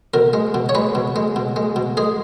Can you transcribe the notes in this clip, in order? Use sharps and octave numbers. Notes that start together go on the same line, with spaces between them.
B2 A#4
G#3
B2
C#5
G#3 B4
B2
G#3
B2
G#3
B2
G#3 G#4